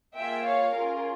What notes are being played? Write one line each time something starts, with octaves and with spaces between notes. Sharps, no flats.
A#3 F4 G#4 E5 G5
C#5 F5
C#4 F4 G#4 A#4